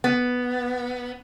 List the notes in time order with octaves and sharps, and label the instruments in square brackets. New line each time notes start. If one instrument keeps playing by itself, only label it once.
[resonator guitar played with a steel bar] B3